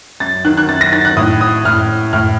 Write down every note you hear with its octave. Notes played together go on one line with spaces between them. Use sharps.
F#2 A6
D#3 F#6
F#6
F#2 A6
A#6
D#3 A6
F#6
A2 D#6
D#6
A2 F6
A2 F6